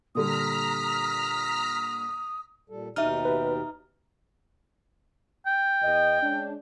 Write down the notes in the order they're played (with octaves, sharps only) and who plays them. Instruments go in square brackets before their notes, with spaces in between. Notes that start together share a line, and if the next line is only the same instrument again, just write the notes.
[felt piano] A#2 D3 G3 [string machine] A#5 F6 B6 [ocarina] D#6
[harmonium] A#2 G3 A4
[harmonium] D#2 B2 G4 [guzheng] D#4 [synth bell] E5 F6
[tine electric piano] B4
[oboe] G5
[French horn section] E2 D#5
G#3 C#4 D4